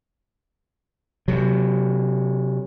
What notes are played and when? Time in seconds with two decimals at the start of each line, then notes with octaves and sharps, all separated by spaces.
1.28 C3 F#3